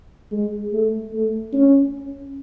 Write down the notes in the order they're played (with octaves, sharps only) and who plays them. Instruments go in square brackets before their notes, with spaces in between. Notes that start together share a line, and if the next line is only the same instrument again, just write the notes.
[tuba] G#3
A3
A3
C#4